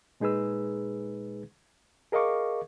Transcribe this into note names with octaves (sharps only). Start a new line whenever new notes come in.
A#2 G#3 D#4 G#4 B4 E6
G#4 A#4 D#5 F5 C#6 D6